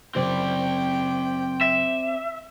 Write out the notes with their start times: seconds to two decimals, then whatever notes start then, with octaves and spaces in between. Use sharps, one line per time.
0.15 F#1 C4 C5 D5 G5
1.61 E5